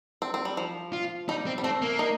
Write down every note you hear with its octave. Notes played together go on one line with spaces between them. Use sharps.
C4
C4
G3
F3
F4
G3 D#4
C4
G3
A3 C4
A#3
D#4